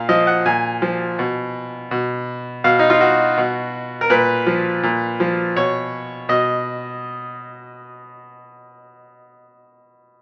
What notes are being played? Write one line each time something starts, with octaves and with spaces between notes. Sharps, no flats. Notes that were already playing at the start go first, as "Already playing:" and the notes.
Already playing: A#2 F5
F3 D#5
F#5
A#2 G#5
F3
B2
B2
B2 F5
D#4
F4
F#4
B2
A#4
A#2 B4
F3
A#2
F3
B2 C#5
B2 D#5